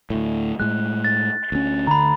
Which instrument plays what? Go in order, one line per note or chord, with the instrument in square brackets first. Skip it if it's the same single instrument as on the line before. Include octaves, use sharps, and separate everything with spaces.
[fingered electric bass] D2 A2
[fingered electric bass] A2 G#3 [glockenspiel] F#6
[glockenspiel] A6
[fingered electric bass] D2 C#4
[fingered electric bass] D2 D3 [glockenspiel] A#5 B5